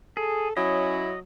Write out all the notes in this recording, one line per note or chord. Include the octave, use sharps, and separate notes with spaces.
G#4 A4
F#3 C#4 E4 D#5